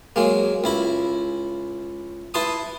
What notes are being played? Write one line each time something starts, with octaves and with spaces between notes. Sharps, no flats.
F#3 G#3 A#3
C#2 E4 B5
E4 B4 A5 C6 D#6